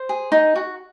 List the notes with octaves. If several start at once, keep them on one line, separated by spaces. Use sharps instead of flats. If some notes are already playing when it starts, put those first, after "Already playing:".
Already playing: C5
G#4
D#4
F#4